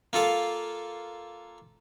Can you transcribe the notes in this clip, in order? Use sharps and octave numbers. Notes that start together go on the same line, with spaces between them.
A#3 F4 A4 F5